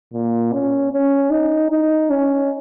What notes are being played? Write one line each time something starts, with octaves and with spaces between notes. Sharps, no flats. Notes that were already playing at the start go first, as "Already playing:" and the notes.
A#2
C#4
C#4
D#4
D#4
C#4